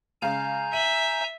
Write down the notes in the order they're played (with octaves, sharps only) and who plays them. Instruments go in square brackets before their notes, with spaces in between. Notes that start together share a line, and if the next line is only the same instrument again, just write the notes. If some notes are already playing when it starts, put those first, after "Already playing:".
[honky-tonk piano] C#3 G#3 F5 [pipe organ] G#5 A#5 G6
[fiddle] E5 [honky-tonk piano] D#7 F#7